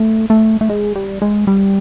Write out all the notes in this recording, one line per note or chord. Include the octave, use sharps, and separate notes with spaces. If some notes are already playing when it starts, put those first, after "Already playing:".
Already playing: A3
A3
A3
G#3
G3
G#3
G3